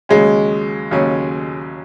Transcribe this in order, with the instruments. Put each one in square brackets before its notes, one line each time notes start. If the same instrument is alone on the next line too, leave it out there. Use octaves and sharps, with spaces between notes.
[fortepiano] D#2 C#3 F#3 C#4 [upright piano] G#3
[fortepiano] D#2 C#3 F#3 C#4